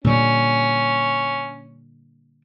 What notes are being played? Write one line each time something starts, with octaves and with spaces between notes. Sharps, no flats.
A#2 D3 G3 C#4